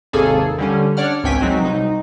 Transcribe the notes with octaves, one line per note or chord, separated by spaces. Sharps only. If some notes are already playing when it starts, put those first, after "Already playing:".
G#1 D#2 C3 A#3 G#4 A4
D3 G3 C#4
D4 C#5 D5 F#5 F6
G#1 C#2 G5 G#5 B6
F#3 G#3 C4 D#4 F#4
C2 D#4